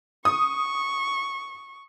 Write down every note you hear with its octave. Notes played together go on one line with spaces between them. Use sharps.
C#6 D#6